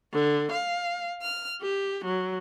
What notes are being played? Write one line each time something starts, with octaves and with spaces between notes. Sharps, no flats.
D3
F5
F6
G4
F#3